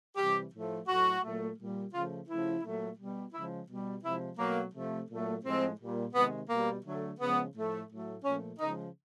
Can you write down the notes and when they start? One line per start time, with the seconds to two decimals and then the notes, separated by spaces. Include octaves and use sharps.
0.16 C3 E3 G3 G4
0.52 A2 F3 A3
0.86 A2 F#3 A3 F#4
1.23 A#2 F#3 A3
1.57 A#2 G3
1.92 C#3 F3 A3 F4
2.28 C#3 F3 A3 E4
2.63 A#2 F#3 A3
2.97 B2 G3
3.33 C#3 F3 G#3 E4
3.68 B2 G3
4.03 C3 F3 G#3 E4
4.38 B2 F#3 A3 A#3
4.73 C3 F3 A3
5.09 A#2 F#3 A3
5.43 A2 F3 G#3 C4
5.79 A#2 G3
6.13 C3 D#3 G#3 B3
6.49 B2 G3 A#3
6.83 D3 F#3 A3
7.19 C#3 F3 G#3 B3
7.54 A2 F3 A3
7.89 A2 F#3 A3
8.24 A#2 F3 A3 C#4
8.59 C#3 F3 G#3 D#4